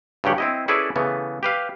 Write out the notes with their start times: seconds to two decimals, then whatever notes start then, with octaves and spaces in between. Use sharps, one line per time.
0.24 G2 C#3 F#3 G4 F#5
0.38 C4 E4 D#5
0.68 C#4 E4 G#4 A4 B4 D5
0.96 C#3 E3 A3 B3
1.43 G4 B4 F5